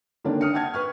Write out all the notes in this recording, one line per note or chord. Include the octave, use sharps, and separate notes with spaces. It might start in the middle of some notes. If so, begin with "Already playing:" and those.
D3 D#3 A#3 C#4 D4
D#6 F6 C#7
F#5 G5 A5 F6 G#6
B4 C#6 F6